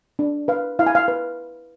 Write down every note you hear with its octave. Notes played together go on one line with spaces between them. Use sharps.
D4
B4 F5
E4 F5
G#5
F5
B4